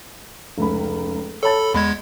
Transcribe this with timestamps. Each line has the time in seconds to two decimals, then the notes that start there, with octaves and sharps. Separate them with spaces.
0.57 F1 C#2 B5
1.43 A4 C#5 A5 B5 A6
1.74 E2 G#3 B5 G#6